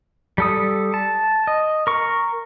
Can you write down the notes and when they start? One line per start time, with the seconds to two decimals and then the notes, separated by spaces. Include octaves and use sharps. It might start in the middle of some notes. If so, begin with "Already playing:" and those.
0.38 G3 A4 D#6
0.94 A5
1.47 D#5
1.87 A#4 C#6